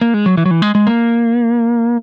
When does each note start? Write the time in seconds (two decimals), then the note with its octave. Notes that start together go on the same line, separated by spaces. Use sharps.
0.01 A#3
0.14 G#3
0.26 F#3
0.37 E3
0.46 F#3
0.51 E3
0.62 G#3
0.75 G#3
0.87 A#3